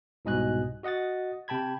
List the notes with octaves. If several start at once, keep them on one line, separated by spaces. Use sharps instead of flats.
C2 G#2 B2 D#5 G#5 F#6
F#4 D#5 F#5 D#6 A6
C3 G5 A5 B5 G#6